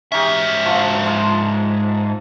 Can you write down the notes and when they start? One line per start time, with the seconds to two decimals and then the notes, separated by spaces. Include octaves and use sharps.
0.12 G#2 C#4 D#4 G4 E5
0.66 F3 F#3 D4
1.06 G#3 D4 F5